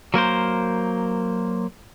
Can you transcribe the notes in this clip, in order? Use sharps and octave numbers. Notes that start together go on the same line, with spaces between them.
F#3 A#3 A#4 C5